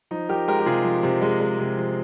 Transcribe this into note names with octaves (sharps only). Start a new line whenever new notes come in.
F3 D#4
F3 G4 A#4
G#3 G4 A#4
G4
C3 F4 G#4
F3
C3
G#3
G#3
C3
F3